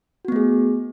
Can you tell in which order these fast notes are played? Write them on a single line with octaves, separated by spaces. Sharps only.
F#4 B3 A3 G#4